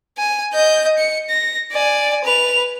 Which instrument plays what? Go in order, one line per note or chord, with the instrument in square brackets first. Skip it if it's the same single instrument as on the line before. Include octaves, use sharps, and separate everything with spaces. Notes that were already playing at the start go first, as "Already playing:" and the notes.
[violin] G#5
D#5 G6
C#7
A#6
D5 G#5
B4 F7